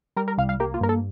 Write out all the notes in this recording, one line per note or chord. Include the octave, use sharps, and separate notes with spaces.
G3 A#4
A#4
C2 F5
F5
A#3 G4
F4
G2 A#4
A4